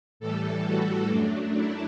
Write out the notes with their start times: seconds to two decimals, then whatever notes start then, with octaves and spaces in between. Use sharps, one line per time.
0.20 A2 E3 G3 A4
0.65 F#4
1.10 F#2 F#3 A3 D4
1.55 E4